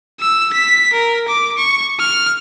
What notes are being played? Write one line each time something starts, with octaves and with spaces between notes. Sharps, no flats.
E6
B6
A#4
D6
C#6
F6